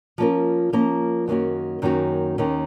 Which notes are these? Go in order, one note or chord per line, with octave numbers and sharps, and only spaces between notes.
F3 A#3 C#4 F4 A#4
F3 A#3 C#4 F4 A#4
F#2 D#3 A#3 C#4 F#4
F#2 D#3 A#3 C#4 F#4
D#2 D#3 A#3 C#4